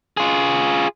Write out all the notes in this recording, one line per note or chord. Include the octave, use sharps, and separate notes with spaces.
F4 G#4